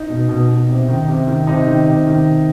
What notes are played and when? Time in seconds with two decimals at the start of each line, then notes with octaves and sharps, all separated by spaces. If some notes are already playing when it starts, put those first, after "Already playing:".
Already playing: D#4
0.10 B2
0.29 B2
0.48 B2
0.69 C3
0.89 D#3
1.08 C3
1.27 D#3
1.47 C3 D#4
1.67 D#3
1.87 C3
2.07 D#3
2.27 C3